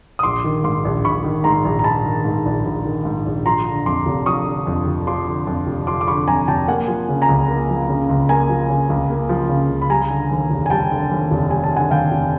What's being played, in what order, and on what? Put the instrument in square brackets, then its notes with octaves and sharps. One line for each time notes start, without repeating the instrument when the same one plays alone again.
[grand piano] D#6
A#1 C6 D6
D#3
G#2 C6 D6
A#1
A#1 B5 C#6
D#3
G#2 A#5 C6
A#1
A#5
A#1 A5 B5
D#3
G#2
A#1
A#1
D#3
G#2
A#1
F3 A#5 C6
D3
F2 C6 D6
F1
F3 C#6 D#6
D3
F2
F1
F3 C6 D6
D3
F2
F1
F3 C6 D6
D6
D3 B5 C#6
F2 G#5 A#5
F1 G5 A5
A#3 F#5 G#5
F3
C#3
G#5 A#5
C#2
A#3
F3
C#3
C#2
A#3 G#5 A#5
F3
C#3
C#2
A#3
F3
C#3
C#2
B5
G3 G#5 A#5
D3
D#2
F1
G#5
G3 G5 A5
D3
D#2
F1
G3 G#5
A5
D3
F#5 G#5
D#2 F5 G5
F1